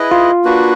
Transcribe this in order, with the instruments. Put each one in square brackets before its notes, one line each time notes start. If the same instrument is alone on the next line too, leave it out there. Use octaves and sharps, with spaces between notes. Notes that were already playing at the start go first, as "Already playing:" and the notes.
Already playing: [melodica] E4 G#4 B4 D#5
[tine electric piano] F4
[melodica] A#3 D4 F#4 B4